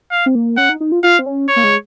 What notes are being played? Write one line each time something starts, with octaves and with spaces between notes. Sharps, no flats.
F5
C4
A#3
C#4 F#5
D#4
D#4
F4
F4 F5
C4
C#4
C#5
A#3
G#3